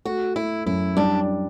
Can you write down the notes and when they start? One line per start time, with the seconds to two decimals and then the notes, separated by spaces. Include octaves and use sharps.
0.05 A3 F#4
0.36 A3 E4
0.66 F#2 E4
0.97 G3 D4